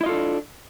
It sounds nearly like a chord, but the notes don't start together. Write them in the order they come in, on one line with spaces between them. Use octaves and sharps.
E4 D#5 F4 A4 D4